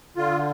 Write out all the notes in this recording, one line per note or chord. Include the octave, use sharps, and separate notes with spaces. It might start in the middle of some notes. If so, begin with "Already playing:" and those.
D3 F4